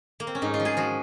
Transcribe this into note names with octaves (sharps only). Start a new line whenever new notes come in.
A#3
C4
C#4
G#2 D#4
F4
F3
G#4
F3 F#4